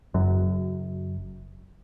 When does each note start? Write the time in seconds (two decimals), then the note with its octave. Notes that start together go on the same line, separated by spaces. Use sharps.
0.14 F#1 F#2